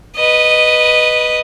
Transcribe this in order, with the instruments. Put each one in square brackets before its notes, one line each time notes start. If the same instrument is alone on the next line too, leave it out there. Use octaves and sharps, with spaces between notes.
[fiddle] B4 D#5